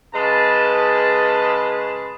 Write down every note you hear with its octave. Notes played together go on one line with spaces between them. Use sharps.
C#3 G#3 G#4 B4 A5